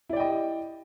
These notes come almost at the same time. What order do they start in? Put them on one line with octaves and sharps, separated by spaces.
E4 D5 G5 D#5 G4